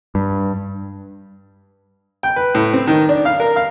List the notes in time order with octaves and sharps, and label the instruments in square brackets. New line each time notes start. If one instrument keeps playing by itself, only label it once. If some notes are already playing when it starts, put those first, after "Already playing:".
[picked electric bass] G2
[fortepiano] G5
B4
A2
C4
D#3
D4
F5
A#4
F5